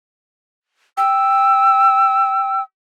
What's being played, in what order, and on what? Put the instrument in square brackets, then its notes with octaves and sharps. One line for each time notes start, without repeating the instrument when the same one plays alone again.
[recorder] G5 [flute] E6